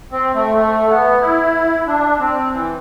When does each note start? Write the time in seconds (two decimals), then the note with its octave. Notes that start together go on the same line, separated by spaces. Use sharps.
0.12 C4
0.35 A3
0.57 A3
0.90 B3
1.21 E4
1.87 D4
2.19 C4
2.52 E3